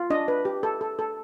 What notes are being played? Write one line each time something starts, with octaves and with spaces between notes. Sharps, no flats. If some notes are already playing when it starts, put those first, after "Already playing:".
Already playing: F4
D4 D#5
B4
G4
A4
A4
A4